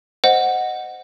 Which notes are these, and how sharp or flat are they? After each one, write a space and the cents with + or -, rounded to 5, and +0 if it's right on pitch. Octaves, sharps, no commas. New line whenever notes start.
C5 +0 D#5 -10 F#5 +0